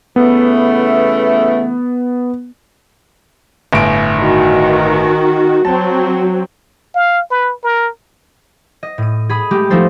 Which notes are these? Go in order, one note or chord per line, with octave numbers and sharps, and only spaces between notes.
C#3 E3 A3 B3
G1 A2 D7
D#3 F#4
F#3 C4 A5
F5
B4
A#4
D#5
A2 D#7
G#4 B5 D#6
G#3 A3 G4
F3 G#3 A3 D#4 A4 C5